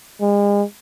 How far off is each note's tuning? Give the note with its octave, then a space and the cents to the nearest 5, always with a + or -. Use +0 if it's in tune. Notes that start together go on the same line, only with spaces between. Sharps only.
G#3 -40